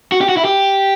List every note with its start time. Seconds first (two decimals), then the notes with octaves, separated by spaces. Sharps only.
0.12 F#4
0.21 G4
0.29 F#4
0.37 E4
0.45 G4